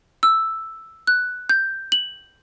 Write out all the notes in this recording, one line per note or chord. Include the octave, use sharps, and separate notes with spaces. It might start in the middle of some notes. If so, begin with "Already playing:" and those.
E6
F#6
G6
F#7